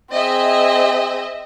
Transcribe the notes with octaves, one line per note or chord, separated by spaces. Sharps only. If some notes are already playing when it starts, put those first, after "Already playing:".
C4 G#4 D#5 E5